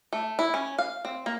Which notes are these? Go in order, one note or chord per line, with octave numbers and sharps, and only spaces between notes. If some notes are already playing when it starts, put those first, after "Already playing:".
A3
E4
C#4
F5
C4
A#3